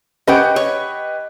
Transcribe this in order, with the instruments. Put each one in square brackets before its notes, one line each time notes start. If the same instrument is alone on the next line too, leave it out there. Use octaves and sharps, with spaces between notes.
[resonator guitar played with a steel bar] C#4 F#5 G5 [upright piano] G4 B4 D#5
[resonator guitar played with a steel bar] C#5